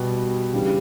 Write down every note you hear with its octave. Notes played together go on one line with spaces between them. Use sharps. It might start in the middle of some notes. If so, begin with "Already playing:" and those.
Already playing: B2 G3 B3
C#3 E3 G3 D4 G4